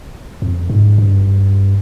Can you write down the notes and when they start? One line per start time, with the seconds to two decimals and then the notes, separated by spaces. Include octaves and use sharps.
0.42 F2
0.70 G#2
0.98 G2